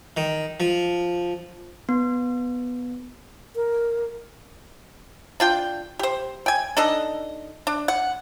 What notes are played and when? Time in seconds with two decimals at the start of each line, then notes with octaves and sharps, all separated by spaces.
0.17 D#3
0.60 F3
1.89 B3
3.56 A#4
5.40 D4 F4 G5
5.99 G4 C5
6.46 G5 G#5
6.77 D4 D#4 A4 D#5
7.67 D4
7.88 F#5